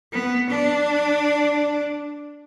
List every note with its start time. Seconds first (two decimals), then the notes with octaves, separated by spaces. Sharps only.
0.13 B3
0.51 D4